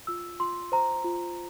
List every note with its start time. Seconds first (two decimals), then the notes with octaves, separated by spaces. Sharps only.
0.07 F4 E6
0.40 F4 C6
0.72 C5 A#5
1.04 F4